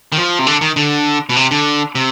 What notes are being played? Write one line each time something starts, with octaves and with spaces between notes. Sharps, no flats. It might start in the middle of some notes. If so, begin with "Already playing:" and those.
D#3
F3
C3
D3
D#3
D3
B2
C3
D3
C3